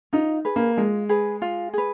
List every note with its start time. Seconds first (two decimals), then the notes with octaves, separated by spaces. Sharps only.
0.13 D#4 F4
0.45 G#4 B4
0.56 A#3
0.77 G#3 F4
1.09 G#4 B4
1.42 F4
1.73 G#4 B4